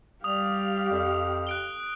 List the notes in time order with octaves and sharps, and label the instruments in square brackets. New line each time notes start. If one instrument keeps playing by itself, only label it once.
[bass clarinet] G3 [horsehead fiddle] G4 F5 [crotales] D#6 F7
[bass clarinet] F2
[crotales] F#6 D7 G7